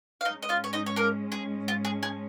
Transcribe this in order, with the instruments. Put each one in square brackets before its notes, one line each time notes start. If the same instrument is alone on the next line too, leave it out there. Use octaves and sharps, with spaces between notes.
[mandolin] F5
[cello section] G#2 G#3 C#4 [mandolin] D#4 D#5
[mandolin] D#5
F4 F5
C#5
D#4 D#5
C#5
A#3 A#4
G#4
F4
G#4
G#4